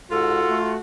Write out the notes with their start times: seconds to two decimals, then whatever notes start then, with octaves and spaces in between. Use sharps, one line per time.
0.11 G#2 F4 F#4 A4
0.49 A3